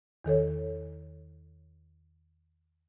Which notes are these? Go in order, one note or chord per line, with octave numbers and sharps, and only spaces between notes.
E2 D#3 A4 C#5